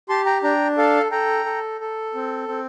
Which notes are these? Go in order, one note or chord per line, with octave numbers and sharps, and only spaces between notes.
G4 A5 C6
G5 A#5
D4 G5 A#5
A4 F5 A5
A4 G5 A#5
A4
A4
C4
C4